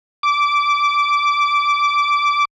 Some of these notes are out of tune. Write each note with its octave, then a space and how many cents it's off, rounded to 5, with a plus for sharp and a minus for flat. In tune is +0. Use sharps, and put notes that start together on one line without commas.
D6 -15